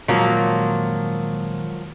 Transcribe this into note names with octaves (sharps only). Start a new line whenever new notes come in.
A#2 D#3 F3 F#3 G#3 A#3